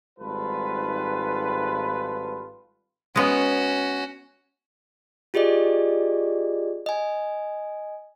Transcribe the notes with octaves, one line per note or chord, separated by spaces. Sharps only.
G#1 G#2 G3 F4 A4 B4
G#3 B3 C#4 F#4
F4 G4 G#4 D5 D#5
D#5 G#5